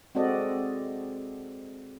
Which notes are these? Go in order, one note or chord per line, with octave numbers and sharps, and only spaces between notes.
G#3 C4 F#4 A4 D5 D#5